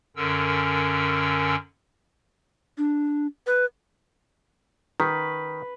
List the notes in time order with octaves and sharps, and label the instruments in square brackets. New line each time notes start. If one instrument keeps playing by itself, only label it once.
[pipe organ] F#2 D3 C#4 A#4 E6
[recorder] D4
B4
[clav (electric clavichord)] D#3 [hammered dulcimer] B4